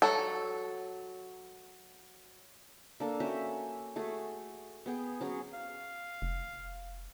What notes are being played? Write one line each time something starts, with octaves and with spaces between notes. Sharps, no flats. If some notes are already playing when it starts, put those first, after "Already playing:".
F#3 A4
A#3 D4 A4
C#4 F#4 E5 G5
A3 F#4 G#4
B3 G#4 G5
F#3 C#4 G#4
F5
F1